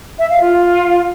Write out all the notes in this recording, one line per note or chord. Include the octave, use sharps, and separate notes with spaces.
E5
F5
F4